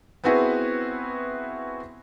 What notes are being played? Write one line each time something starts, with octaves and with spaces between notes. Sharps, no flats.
B3 C4 E4 F#4 G#4 B4